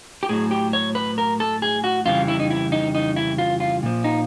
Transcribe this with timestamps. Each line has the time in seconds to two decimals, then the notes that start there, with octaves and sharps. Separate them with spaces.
0.23 G4
0.29 A2 F#3 G#4
0.51 G4
0.73 C#5
0.95 B4
1.18 A#4
1.40 A4
1.62 G#4
1.84 F#4
2.05 F2 C#3 E3 G3 F4
2.28 E4
2.40 D#4
2.50 E4
2.72 D#4
2.95 D#4
3.16 E4
3.38 F4
3.60 F4
3.83 A#2 F3
4.04 D#4